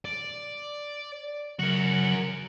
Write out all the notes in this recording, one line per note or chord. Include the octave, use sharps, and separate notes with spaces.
D5
C#3 F#3 F#4 A#4